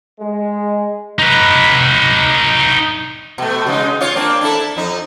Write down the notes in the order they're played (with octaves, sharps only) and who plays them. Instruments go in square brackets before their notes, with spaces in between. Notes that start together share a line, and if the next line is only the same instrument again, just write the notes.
[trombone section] G#3
[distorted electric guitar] D#4 B4
[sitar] B2 A3
C#3 G#3 D#4
F4 C#5
A#3 C4 D4
D4 E4 A4
F2 D#4